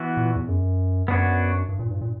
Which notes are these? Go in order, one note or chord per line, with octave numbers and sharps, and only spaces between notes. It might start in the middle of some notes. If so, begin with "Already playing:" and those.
Already playing: E3 B3 F#4
A#2
E2
F#2
F#2 B3 D4 F#4 C#5
G2
A#2
G2
A#2